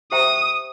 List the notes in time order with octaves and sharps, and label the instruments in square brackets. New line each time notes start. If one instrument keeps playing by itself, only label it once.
[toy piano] G4 C5 E5 G5 A#5 [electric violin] D#6